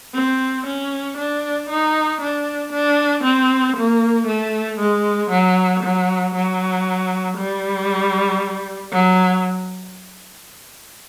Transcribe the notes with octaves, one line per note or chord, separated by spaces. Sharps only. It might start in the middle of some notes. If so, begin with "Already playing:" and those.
C4
C#4
D4
D#4
D4
D4
C4
A#3
A3
G#3
F#3
F#3
F#3
G3
F#3